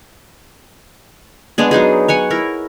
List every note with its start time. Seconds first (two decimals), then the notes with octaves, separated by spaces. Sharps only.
1.58 G#3 B3 D4 G#4
1.71 F#3 D4 D#4 G#4
2.08 C#5 F#5 G#5
2.30 E4 A#4